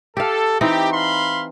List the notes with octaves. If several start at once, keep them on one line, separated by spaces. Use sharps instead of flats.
G4 A4 F5
E3 C4 D#4 G4
F5 B5 C6